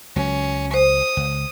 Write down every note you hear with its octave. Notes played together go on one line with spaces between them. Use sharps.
C#2 F#3 C#4
C5 D#6
C#2